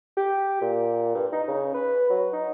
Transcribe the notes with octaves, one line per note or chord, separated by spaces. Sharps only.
G4
A#2
G2
D#4
C#3
B4
F#3
D#4